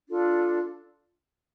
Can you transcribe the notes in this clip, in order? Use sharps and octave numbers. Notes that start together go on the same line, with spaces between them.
D4 F4 A4